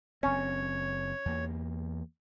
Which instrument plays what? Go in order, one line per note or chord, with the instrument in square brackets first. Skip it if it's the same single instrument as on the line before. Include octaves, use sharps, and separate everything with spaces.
[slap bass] F#1 C4 [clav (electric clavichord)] C#4 [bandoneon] C#5
[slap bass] E2 A#3